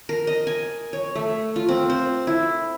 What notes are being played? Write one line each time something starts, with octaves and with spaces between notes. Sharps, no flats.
A#4
D#5
G#5
C#5
A3
F4
C4
C5
E4